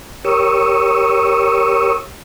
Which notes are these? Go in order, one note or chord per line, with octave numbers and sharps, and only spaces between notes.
G4 A#4 C#5 C#6 D#6 E6